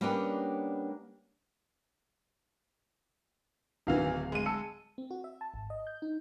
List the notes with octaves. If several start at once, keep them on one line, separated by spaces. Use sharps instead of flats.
G3 A#3 B3 C#4 D4 G4
D1 D#3 E3 F#4 F5
G#3 D#7
A5 E6 C#7
C4
F#4
E5
A5
G#1
D#5
G6
D#4